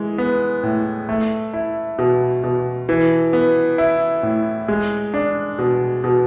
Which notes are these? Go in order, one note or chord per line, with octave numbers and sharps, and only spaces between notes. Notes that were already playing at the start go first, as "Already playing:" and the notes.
Already playing: E3 G#3
B3
A2
A3
E4
B2
B2
E3
B3
E4
A2
G#3
D4
B2
B2